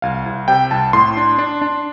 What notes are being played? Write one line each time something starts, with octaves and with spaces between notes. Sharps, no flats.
C2 F5
C2
C3 G5
C2 A5
A2 C6
D4
D4
D4